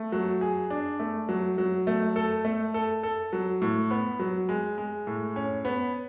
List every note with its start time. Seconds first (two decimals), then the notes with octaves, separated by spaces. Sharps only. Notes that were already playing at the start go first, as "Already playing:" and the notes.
Already playing: A3
0.12 F#3
0.41 G#4
0.70 D4
0.99 A3
1.29 F#3
1.58 F#3
1.87 A3
2.16 A4
2.45 A3
2.74 A4
3.03 A4
3.33 F#3
3.62 A2
3.91 B3
4.19 F#3
4.49 G#3
4.78 G#3
5.07 A2
5.36 C#4
5.65 B3